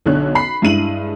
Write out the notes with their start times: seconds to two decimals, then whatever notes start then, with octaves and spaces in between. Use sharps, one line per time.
0.06 B1 D3 C#5 F#6
0.35 B5 C7
0.62 G2 G#3 E4 D#7 F#7